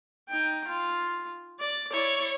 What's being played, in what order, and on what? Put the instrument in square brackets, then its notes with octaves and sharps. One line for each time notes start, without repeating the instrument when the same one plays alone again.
[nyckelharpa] D#4 G5
F4
D5
[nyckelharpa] E4 D5 [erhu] C#5